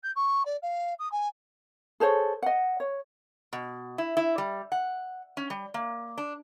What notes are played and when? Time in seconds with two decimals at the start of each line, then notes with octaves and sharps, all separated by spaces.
0.03 G6
0.15 C#6
0.45 D5
0.62 F5
0.99 D#6
1.11 G#5
2.00 G#4 A4 C5 C#5
2.42 D#5 F#5
2.80 C#5
3.53 B2
3.98 E4
4.17 E4
4.38 G3
4.72 F#5
5.37 C#4
5.50 G3
5.74 A#3
6.18 D4